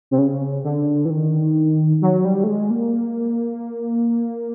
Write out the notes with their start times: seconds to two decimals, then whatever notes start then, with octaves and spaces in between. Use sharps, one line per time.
0.11 C3
0.18 C#3
0.64 D3
1.05 E3
1.10 D#3
2.02 F#3
2.25 G3
2.44 A3
2.48 G#3
2.71 A#3